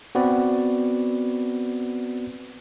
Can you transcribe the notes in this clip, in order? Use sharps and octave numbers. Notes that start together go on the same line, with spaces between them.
B3 C4 F#4 B4 D5